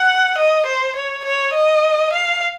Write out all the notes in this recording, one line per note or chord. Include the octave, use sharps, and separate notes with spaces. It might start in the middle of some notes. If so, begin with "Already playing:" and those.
Already playing: F#5
D#5
C5
C#5
C#5
D#5
F5